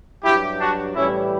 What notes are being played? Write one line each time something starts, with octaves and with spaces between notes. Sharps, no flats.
G2 F#3 E4 G4
D4 F#4
A2 E3 G3 C#4 E4